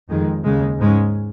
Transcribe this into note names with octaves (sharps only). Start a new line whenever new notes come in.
F2 D#3 G#3
D#2 C#3 G#3
G#2 G#3 C#4